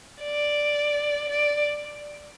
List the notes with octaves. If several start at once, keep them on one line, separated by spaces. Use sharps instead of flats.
D5
D5